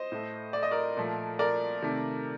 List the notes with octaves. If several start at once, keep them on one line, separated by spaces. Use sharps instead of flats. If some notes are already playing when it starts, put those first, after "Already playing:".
Already playing: C5 D#5
A2 A3
D5
D#5
A#4 D5
A#2 F3 A3
A#4 D5
C3 D#3 A3